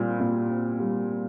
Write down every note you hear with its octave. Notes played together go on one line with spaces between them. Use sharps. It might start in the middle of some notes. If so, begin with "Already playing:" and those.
Already playing: A#2 G3 C4 F4
A#2
C4
G3